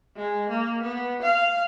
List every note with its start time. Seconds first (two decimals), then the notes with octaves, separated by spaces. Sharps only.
0.16 G#3
0.50 A#3
0.82 B3
1.23 F5